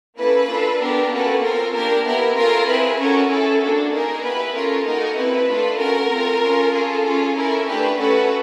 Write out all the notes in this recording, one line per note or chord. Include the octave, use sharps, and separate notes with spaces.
A#3 C#4 E4 A4 B4
D4 F4 A4
B3 D4 G4 A#4
A#3 C#4 F#4 A4 B4
C4 F4 A4 A#4
A#3 D4 G4 A#4
B3 E4 G4 A#4
C#4 F4 A4 A#4
C4 E4 G#4 B4
C#4 F#4 A4 A#4
C#4 E4 G#4 A4
A#3 D4 F#4 A4
A#3 D#4 G#4 A#4
B3 E4 G4 B4
C#4 F4 A4 A#4
A#3 D#4 F#4 A4 A#4
C4 E4 A4 B4
A3 D4 F4 A4
C#4 F#4 A4 A#4
C4 F4 A4
C#4 F4 A4
C#4 F4 G#4 A4
C#4 F4 G#4
C#4 E4 A4 A#4
A3 D4 G4 B4
A3 C#4 F#4 A4 B4